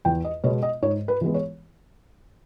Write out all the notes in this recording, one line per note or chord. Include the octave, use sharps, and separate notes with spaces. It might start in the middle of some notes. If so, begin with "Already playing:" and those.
E2 G5
D#5
B2 G#3 B3 C#5
D#5
G#2 C#5
B4
E3 G#3 B3
C#5